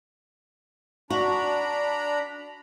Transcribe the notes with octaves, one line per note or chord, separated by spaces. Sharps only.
D4 F#4 A#5 B5